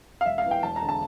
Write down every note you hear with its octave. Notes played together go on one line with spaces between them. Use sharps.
F5
E1 E5
F5
E2 E3
G5
E1 A5
A#5
D3
A5